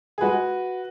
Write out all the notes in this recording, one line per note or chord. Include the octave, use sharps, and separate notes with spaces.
G#4
G#3 F#4 B4